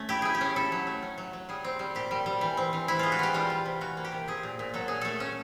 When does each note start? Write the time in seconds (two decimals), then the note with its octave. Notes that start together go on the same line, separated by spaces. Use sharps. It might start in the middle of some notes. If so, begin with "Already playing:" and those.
Already playing: A3 C#4
0.09 E4 G4
0.22 E4 G#4
0.35 G4
0.41 C#4
0.56 E4 A4
0.72 F#3
0.87 A3
1.02 C#4
1.18 F#3
1.33 F#3
1.49 G3 G#4
1.64 C4
1.79 G3
1.95 A#2 G4
2.11 G3
2.26 G3
2.41 E3
2.57 C4
2.73 E3
2.88 E3 E4
2.99 G#3 F4
3.12 F#4
3.19 E3 G4
3.34 G3 F4
3.50 G3
3.66 C3
3.81 E3 F#4
3.97 A#3
4.05 G4
4.12 C3
4.28 C4 G#4
4.43 A#2
4.59 A#2
4.74 F#3 A4
4.88 A#2 G#4
5.01 A3 A4
5.20 C#4